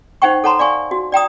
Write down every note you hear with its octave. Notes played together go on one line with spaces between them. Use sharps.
D#4 C5 F#5 G5 C#6
A4 C#5 F#5 A5 A#5 C6
D5 F5 G#5 C#6
F#4
D5 G5 A#5 D#6